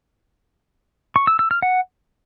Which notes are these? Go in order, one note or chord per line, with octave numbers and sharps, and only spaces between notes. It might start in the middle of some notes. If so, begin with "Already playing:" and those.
C#6
E6
E6
F6
F#5